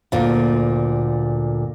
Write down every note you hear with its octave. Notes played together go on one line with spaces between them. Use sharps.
D2 A#2